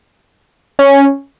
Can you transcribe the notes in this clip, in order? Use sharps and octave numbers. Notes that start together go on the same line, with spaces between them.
C#4